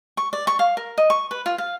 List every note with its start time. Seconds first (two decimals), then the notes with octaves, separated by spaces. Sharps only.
0.17 C#6
0.33 D5
0.47 C#6
0.59 F5
0.77 A#4
0.98 D#5
1.10 C#6
1.31 B4
1.46 F4
1.58 F5